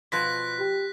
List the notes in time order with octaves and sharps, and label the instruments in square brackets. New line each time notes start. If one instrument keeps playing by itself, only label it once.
[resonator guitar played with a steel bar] B2 F3 B4 [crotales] F#6 A#6 B6
[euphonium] G4